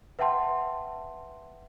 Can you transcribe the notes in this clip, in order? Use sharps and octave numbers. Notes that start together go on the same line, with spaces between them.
B4 E5 F#5 G5 A5 C6